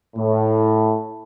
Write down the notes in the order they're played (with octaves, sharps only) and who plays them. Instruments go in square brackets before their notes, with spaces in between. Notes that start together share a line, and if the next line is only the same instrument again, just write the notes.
[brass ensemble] A2